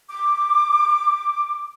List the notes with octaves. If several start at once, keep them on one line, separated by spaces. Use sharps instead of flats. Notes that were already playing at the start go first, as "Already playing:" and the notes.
D6